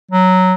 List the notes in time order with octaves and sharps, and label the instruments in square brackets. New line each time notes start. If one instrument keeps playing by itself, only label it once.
[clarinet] F#3